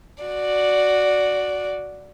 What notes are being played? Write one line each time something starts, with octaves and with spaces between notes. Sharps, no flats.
F#4 D5